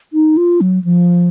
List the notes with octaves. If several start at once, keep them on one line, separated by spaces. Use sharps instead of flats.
D#4
F4
F#3
F3